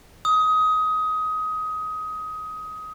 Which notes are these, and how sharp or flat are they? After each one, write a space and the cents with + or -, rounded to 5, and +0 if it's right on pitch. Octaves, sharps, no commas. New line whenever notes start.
D#6 +20